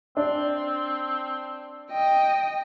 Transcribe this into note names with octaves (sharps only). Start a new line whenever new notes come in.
C4 D4
D#5 G5